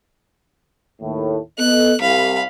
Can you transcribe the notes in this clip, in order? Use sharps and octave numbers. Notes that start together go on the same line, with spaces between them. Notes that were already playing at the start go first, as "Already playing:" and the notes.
D#2 A2
B3 A4 D#5 F#6
C2 F5 B5